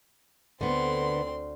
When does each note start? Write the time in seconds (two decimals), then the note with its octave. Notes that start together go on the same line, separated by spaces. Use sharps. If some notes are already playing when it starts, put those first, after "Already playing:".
0.61 D2 D3 B3 C4 C6